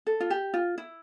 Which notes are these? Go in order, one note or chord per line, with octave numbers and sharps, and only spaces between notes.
A4
F4
G4
F4
E4